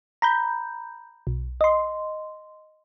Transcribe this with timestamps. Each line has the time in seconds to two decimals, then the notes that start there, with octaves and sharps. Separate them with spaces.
0.22 A#5 B5 G6
1.27 B1
1.61 D#5 C6